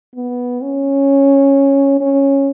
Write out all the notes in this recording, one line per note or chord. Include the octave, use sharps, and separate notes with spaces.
B3
C#4
C#4